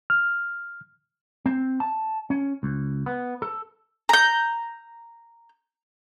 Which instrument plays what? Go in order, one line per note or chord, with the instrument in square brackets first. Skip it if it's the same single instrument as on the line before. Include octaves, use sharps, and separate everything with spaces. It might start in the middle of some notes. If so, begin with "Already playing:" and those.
[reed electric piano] F6
[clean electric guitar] C4
A5
C#4
C#2
B3
A4
[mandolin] A#5 G6